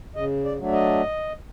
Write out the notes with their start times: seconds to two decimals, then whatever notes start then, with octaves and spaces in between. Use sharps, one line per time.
0.15 C#3 D#5
0.45 D5
0.59 F#3 A3 D4
0.73 D#5